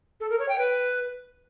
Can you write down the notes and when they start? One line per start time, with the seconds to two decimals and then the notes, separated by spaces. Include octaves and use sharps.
0.20 A4
0.30 A#4
0.39 C#5
0.49 G5
0.58 B4